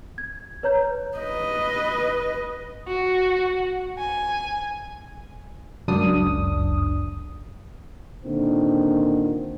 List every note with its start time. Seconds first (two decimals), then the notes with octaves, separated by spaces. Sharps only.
0.18 G#6
0.63 B4 C#5 A#5 G6
1.18 B4 D#5
2.88 F#4
3.99 G#5
5.88 G1 C#2 F#2 D4 D#6
8.25 A#2 D3 D#3 C4